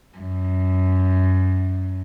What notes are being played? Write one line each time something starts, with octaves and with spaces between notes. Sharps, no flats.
F#2